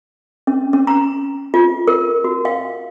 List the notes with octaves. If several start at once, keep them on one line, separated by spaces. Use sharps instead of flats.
C#4
C#4
A#5
F4
A#4
F#4
F5